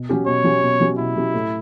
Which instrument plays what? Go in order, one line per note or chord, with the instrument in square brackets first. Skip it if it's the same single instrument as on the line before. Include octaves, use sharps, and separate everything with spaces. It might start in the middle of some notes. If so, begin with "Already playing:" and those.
Already playing: [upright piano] B2
F#3 C#4 G4
[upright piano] B2 [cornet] C#5
[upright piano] F#3 C#4 G4
B2
F#3 C#4 G4
[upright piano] B2 [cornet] E4
[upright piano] F#3 C#4 G4
A2